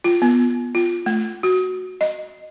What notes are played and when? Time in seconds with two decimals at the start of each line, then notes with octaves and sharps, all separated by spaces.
0.04 F4
0.22 B3
0.75 F4
1.06 A3
1.43 F#4
2.01 D#5